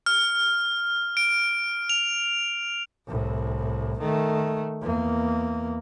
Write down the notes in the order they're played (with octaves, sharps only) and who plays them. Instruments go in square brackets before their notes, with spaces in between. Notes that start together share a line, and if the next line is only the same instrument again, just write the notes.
[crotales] F6
D7
F7
[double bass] C2 A2
D#3 A3
E2 A#3